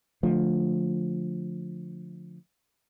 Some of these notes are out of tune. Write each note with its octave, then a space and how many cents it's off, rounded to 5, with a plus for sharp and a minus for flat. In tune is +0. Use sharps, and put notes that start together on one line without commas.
D3 +0 F3 +15 A3 +0